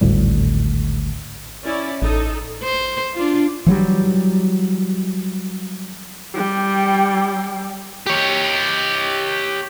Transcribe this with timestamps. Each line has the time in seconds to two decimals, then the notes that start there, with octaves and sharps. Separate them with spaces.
0.01 G#1 D2 A2 G3
1.64 C#4 E4 D5
2.02 A1 D#4 A4
2.64 C5
3.14 D4 F4
3.66 E3 F#3 G3
6.34 G3 G5
8.07 G4 C#5